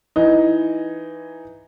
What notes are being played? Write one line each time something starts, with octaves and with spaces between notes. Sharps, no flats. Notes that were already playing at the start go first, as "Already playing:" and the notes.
E3 D#4